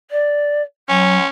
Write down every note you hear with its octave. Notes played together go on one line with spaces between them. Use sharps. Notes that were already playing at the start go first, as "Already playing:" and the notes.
D5
F#3 C#4